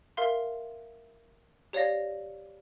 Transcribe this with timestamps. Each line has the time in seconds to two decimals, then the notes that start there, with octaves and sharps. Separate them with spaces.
0.17 A#4 E5 F5 C6
1.73 G4 C#5 D5 F5 A#6